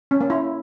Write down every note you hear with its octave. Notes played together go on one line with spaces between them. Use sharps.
C#4
A#3
E4